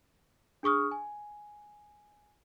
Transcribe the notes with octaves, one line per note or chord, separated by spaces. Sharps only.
D4 G#4 C#6 D#6 F6
G#5